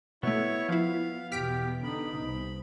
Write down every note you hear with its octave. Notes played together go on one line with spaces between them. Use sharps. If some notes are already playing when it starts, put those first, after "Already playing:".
B2 A3 B3 E4 C#5 C#6
F3 E4 F5
E2 B2 G4 F6 B6 D7
D3 D#4 B5
C2